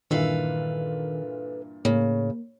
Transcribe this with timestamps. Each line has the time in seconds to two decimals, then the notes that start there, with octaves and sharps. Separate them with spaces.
0.11 G2 A#2 D#3 E3 A4 B4 F5
1.85 A2 C#3 A#3